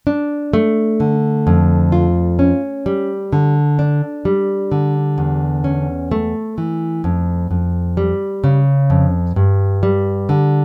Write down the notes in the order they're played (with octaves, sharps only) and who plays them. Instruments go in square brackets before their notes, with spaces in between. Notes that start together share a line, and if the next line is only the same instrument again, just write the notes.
[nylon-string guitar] D4
A3
D3
F2
F4
C#4
G3
D3
D4
G3
D3
E2
C#4
A3
E3
F2
F2
G3
C#3
F2
G2
G3
D3